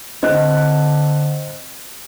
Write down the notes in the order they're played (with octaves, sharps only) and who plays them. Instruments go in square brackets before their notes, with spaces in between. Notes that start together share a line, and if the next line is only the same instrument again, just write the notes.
[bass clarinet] D3 [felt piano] C4 F#6 [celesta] D#5